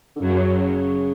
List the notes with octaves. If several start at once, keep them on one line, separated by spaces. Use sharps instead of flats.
D3
F#2 C#3 F#3